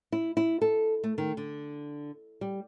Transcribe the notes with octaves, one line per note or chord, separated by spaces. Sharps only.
E4
E4
A4
A3
D#3
D3
G3